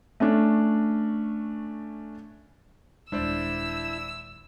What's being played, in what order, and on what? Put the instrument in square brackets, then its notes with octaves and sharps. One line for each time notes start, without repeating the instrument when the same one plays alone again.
[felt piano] A3 C#4 D4
[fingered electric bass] D#1 G#3 [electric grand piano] D4 C5 D5 [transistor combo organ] E4 [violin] E6